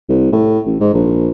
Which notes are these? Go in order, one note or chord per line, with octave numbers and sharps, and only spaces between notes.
C2
A2
A1
G#2
A#1